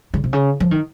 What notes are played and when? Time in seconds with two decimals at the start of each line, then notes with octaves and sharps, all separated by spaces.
0.14 C#3
0.24 C3
0.33 C#3
0.60 F3
0.71 D#3